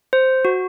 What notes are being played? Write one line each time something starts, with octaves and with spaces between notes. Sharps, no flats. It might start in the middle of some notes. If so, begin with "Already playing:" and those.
C5
F#4